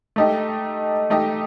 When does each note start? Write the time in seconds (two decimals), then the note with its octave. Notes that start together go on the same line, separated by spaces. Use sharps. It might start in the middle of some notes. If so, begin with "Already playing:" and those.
0.16 A3 D#4 G4 D#5
1.10 A3 D#4 G4 D#5